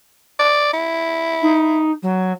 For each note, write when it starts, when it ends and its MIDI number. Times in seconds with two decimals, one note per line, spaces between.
0.39 0.70 74
0.73 1.82 64
1.42 1.91 63
2.02 2.32 54